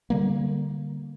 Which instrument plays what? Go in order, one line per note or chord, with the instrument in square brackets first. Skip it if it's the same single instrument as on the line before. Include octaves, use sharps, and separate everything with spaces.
[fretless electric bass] D3 G3 A#3